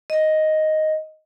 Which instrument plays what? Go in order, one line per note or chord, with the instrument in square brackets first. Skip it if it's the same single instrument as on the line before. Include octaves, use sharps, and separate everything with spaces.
[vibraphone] D#5